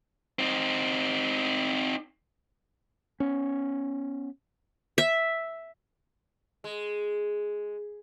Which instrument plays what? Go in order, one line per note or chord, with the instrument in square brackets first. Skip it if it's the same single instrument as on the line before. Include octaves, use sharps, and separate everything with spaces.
[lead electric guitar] C4 D#4
[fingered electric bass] B3 C#4
[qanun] E5
[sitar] G#3